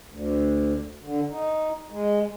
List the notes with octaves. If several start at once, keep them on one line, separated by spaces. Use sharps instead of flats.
D2
D3
D#4
G#3